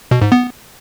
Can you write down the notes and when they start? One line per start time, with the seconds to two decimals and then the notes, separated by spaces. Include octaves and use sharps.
0.11 B2
0.22 G#2
0.32 B3